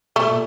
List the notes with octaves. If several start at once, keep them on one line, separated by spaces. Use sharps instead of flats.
B2 A3
A#2